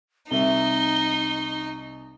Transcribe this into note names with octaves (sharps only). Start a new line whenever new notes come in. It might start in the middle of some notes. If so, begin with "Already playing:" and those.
C2 D#4 E5 G7